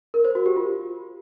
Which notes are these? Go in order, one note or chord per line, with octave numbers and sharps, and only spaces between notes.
A#4
C5
F#4
G4
F4